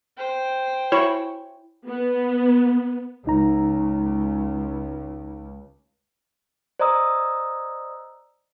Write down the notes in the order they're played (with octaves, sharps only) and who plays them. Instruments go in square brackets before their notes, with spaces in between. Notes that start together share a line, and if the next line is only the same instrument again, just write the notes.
[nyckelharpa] C5 G5
[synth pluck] E4 [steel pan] C#5 C#6
[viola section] B3
[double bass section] C#2 [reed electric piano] D#4 A#5
[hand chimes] C5 D5 D#5 A#5 D#6 E6